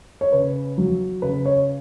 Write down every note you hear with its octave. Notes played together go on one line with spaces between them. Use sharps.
C#5
C#3 B4
F#3
C#3 B4
C#5